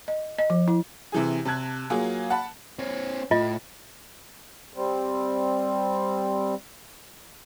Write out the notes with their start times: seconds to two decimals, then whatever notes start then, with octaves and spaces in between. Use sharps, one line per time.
0.08 D#5
0.39 D#5
0.50 F3
0.68 E4
1.12 C3 E3 G#4
1.45 C3 A5 F#6 G#6
1.90 F#3 A#3 F4 G#4
2.30 F#5 A5 B5
2.79 C4 C#5
3.31 A2 F4 D#5
4.74 G3 C4